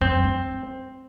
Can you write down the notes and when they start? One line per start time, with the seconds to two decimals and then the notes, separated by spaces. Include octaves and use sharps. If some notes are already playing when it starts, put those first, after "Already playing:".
0.01 F#2 C4
0.24 G2